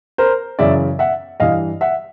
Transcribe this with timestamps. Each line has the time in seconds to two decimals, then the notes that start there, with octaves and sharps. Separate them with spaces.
0.18 A#4 C5
0.59 F#2 C#3 E3 D5 E5
0.99 E5 F#5
1.40 G2 E3 D#5 F5
1.81 E5 F#5